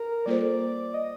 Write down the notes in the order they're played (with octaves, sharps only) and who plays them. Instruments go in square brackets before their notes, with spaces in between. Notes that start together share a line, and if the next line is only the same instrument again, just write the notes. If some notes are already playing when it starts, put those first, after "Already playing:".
Already playing: [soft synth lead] A#4
[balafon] G3 A#3 F4 A4 C5 [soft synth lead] D5
[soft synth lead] D#5